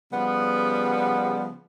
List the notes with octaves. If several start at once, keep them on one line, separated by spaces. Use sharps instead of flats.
C#3 F3 G3 B3